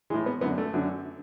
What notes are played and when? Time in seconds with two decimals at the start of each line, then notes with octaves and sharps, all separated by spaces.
0.10 A2 E3 G#3
0.26 B3
0.41 F#2 D3 B3
0.58 A3
0.74 F#2 D3